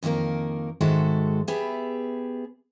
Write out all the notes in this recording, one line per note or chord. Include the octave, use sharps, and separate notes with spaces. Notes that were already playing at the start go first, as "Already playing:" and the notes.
F2 D#3 A3 A#3 A#4
G#2 D#3 G#3 F#4 A4 E5
B3 G4 G#4 E5